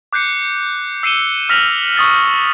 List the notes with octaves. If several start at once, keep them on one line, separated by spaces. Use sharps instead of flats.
D6 F#6 G6 C7 C#7
E6 C7 C#7 D#7 E7 G7
E6 F6 A#6 B6 F7 F#7
C#6 D#6 A6